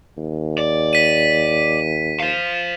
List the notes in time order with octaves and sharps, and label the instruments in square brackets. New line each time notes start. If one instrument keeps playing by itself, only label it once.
[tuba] D#2
[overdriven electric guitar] D5
[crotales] B6 D#7
[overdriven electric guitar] C5 F5